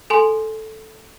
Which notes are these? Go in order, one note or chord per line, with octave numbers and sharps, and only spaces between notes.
A4 G#5 C6